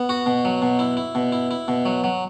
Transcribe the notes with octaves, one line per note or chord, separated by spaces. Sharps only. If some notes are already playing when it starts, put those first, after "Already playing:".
Already playing: B3
F#4
B2
F#3
B2
E4
E4
B2
E4
E4
B2
F#3
F#3